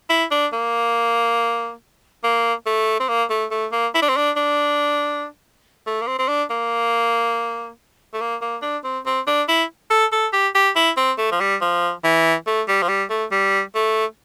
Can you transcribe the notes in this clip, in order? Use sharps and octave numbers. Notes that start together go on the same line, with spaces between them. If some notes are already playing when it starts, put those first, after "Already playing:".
E4
D4
A#3
A#3
A3
C4
A#3
A3
A3
A#3
E4
D4
C4
D4
D4
A3
A#3
C4
C4
D4
A#3
A3
A#3
A#3
D4
C4
C4
D4
E4
A4
A4
G4
G4
E4
C4
A3
F3
G3
F3
E3
A3
G3
F3
G3
A3
G3
A3